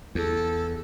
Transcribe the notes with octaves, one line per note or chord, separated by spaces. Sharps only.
E2 A4